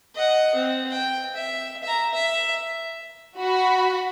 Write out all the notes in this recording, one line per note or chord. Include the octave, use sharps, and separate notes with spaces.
D#5 F#5
C4
G5
E5
E5 A#5
E5
F#4 B5